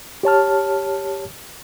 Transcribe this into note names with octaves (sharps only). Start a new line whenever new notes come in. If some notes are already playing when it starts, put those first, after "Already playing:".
G4 C#5 A5 F6